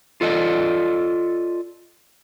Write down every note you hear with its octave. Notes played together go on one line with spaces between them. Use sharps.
F4 A4 D5 D#5